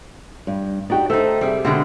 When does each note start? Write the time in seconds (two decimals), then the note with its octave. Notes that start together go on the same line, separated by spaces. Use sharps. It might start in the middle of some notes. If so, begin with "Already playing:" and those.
0.47 G2
0.90 D#4 F#4 G4 D5 G5
1.10 A3 D#4 A4 C5 E6
1.41 C3 G3 G#4 E5
1.65 B2 D3 G#3 G4